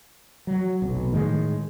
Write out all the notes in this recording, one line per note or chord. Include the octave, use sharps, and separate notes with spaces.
F#3
F1 B1
A2 D#3 G3 G#3